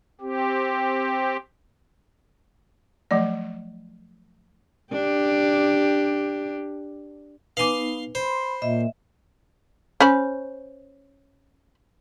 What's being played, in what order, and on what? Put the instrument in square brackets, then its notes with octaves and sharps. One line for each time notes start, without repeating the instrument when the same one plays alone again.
[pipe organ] C4 G4
[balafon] F3 F#3 A3 D5
[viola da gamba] D4 G4
[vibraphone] B3 D#4 [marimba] B4 G#5 D6 [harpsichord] F5 C6
[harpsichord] C5 [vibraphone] B5 [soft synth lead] C6
[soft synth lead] A#2 [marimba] D#5 [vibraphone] E5
[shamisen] C#4 C5 B5